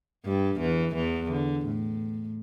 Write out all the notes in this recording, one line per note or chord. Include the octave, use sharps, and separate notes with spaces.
G2 G3
E2 E3
E2 E3
D3
A2